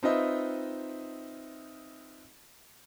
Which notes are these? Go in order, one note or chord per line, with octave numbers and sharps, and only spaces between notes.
C4 D#4 F4 B4 D#5 E5